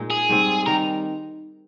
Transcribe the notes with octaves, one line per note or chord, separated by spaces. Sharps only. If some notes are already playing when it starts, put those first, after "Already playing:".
Already playing: A#2 G#3 D#4
G#4
G#2 G3 C4
D#3 G3 A#4